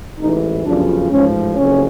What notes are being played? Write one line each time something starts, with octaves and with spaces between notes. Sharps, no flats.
A1 G#2 E3 D#4
G1 F#2 C#3 F3 D4
A1 G#2 F3 C#4
F#1 F2 C#3 C#4